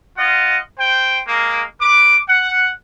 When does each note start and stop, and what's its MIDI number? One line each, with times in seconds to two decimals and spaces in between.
0.17 0.57 65
0.17 0.57 75
0.17 0.57 78
0.78 1.19 72
0.78 1.19 79
1.25 1.62 56
1.25 1.62 58
1.80 2.15 71
1.80 2.15 86
2.28 2.69 78